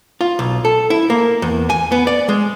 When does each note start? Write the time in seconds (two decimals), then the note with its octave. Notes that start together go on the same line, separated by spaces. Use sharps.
0.21 F4
0.39 B1
0.65 A4
0.90 E4
1.10 A#3
1.42 E2
1.70 G#5
1.92 B3
2.07 D5
2.29 G#3